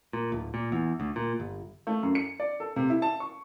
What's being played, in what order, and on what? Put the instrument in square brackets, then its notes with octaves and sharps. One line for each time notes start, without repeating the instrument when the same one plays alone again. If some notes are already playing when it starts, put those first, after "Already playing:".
[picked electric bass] A#2
D1
A#2
E2
D2
A#2
G1
[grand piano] A3
F#2
C#7
D5
A4
C3
E4
A5
C#6